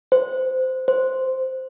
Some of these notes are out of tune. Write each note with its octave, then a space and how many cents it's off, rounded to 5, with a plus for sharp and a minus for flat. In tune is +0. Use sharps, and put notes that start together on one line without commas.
C5 -15
C5 -5